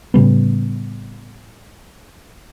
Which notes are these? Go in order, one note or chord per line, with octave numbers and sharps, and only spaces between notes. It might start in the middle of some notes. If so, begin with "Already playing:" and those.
A2 C#3 G3 B3